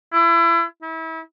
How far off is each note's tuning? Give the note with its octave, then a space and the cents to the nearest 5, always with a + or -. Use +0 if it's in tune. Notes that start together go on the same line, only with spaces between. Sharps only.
E4 +35
E4 -30